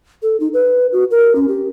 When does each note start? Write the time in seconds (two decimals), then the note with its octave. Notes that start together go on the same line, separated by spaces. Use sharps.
0.22 A4
0.40 D#4
0.53 B4
0.93 F#4
1.11 A#4
1.35 C#4
1.48 G4